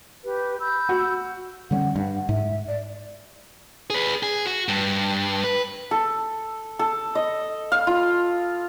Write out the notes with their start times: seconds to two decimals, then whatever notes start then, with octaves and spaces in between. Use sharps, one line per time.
0.24 G4 B4
0.59 B5 E6 G6
0.89 F#4
1.71 D3 G3 C#4 F#5
1.96 G2
2.29 G#2 E5
2.68 D5
3.90 G#4 B4
4.23 G#4
4.46 F#4
4.68 G2
5.44 B4
5.91 A4
6.79 A4
7.15 D#5
7.72 F5
7.87 F4